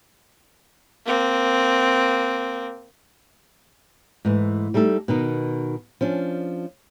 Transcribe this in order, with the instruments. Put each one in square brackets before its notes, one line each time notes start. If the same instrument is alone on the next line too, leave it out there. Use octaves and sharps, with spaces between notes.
[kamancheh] A#3 C4
[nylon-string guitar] G#2 E3 A3
G3 A3 D#4 A4
B2 D#3 D#4
F3 C#4 D4